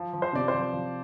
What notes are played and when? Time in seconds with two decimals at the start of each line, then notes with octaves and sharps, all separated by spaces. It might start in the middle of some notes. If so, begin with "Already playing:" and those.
Already playing: F3
0.13 F3
0.22 C5
0.33 C3 D5
0.48 C5
0.53 F3
0.73 F3